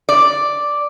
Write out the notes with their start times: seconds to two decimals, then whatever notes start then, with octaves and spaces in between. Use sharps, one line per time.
0.09 D5